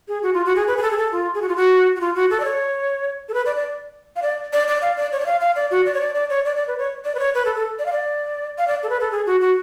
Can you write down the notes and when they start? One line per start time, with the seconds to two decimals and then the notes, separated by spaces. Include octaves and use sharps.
0.08 G#4
0.23 F#4
0.34 F4
0.46 F#4
0.56 G#4
0.67 B4
0.77 G#4
0.82 A4
0.91 G#4
0.98 A4
1.12 F4
1.34 G#4
1.42 F#4
1.49 F4
1.56 F#4
1.96 F#4
2.01 F4
2.15 F#4
2.30 A4
2.40 D5
2.45 C#5
3.29 A4
3.34 B4
3.46 D5
3.56 D5
4.16 F5
4.22 D5
4.53 D5
4.68 D5
4.82 F5
4.96 D5
5.12 C#5
5.20 D5
5.26 F5
5.41 F5
5.56 D5
5.71 F#4
5.86 D5
5.94 C#5
6.01 D5
6.15 D5
6.30 C#5
6.45 D5
6.56 D5
6.67 B4
6.78 C#5
7.05 D5
7.15 B4
7.19 C#5
7.35 B4
7.45 A4
7.56 A4
7.79 D5
7.86 F5
7.93 D5
8.58 F5
8.68 D5
8.83 A4
8.90 B4
9.01 A4
9.12 G#4
9.26 F#4
9.41 F#4